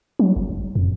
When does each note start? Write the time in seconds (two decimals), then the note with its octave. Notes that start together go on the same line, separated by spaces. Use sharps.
0.19 F#3
0.36 F#1
0.75 F2